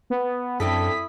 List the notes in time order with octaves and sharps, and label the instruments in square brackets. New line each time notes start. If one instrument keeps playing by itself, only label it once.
[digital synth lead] B3
[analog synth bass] F#2 [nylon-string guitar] C4 D4 A4 [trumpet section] E4 D#6 [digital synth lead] B6